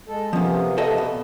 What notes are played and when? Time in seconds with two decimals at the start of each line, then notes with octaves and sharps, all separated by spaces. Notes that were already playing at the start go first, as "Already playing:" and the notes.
0.08 G#3 A4
0.33 C3 F3 A#3 B3 C#4
0.78 A4 D#5 E5
0.98 B2